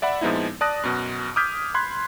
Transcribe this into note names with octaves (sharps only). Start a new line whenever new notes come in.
D5 E5 F#5 B5
A#2 F3 G#3 B3 D#4 E4
D5 A5 D#6 F#6 A#6
F#2 B2
D6 D#6 F6 G6 G#6 B6
B5 C6 F#6 G#6